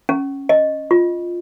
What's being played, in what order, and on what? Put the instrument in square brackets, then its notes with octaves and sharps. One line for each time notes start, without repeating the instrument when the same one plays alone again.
[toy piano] C#4
D#5
F4